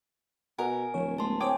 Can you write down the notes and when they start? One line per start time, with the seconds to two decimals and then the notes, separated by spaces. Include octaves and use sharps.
0.59 B2 A#4 F#5 G#5
0.94 D1 F3 C#5
1.18 G#3 A#3 C4 A5 C6
1.40 C5 C#5 G5 G#5 D6 D#6